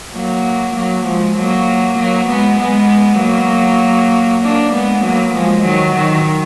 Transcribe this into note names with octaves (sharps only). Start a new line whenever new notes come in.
F#3 A#3
F#3 A#3
F3 G#3
F#3 A#3
F#3 A#3
G#3 B3
G#3 B3
F#3 A#3
A#3 D4
G#3 B3
F#3 A#3
F3 G#3
D#3 F#3
D#3